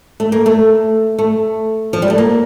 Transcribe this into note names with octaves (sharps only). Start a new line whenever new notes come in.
A3
A#3
A3
A3
F3
G3
A3
A#3